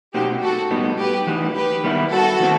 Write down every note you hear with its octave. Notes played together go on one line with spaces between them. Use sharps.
B2 A3 C4 D#4 F#4 G4
F#4 A4
A2 G3 B3 D#4
G4 B4
E3 A3 D#4 F#4
G4 B4
D#3 G3 B3 E4
F#4 A4
D#3 A3 C4 E4